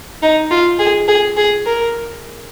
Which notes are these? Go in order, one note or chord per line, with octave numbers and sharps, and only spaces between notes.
D#4
F4
G#4
G#4
G#4
A#4